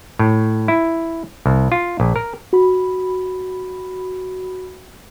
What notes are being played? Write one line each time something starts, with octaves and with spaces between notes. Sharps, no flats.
A2
E4
C2
F4
A#1
A#4
F#4 B5